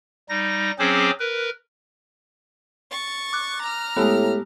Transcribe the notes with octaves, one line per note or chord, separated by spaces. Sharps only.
G3 D#4 A#6
F#3 C4 C#4 G#4 C5 D6
A#4 B4
C#6 A6
D6 F#6
A#5 F6
A2 G#3 A3 B3 G4